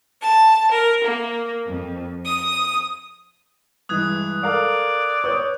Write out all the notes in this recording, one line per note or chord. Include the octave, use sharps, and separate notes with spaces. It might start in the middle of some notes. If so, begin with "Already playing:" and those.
A5
A#4
A#3
F2
D#6
G2 E3 G#3 D#6 F#6 G#6
A4 A#4 D5 F5
B4 C#5 C#6 D#6 G6